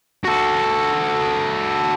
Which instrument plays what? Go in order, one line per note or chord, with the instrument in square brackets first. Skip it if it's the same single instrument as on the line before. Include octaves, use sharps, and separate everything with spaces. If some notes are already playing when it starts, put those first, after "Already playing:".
[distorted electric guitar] F#4 A4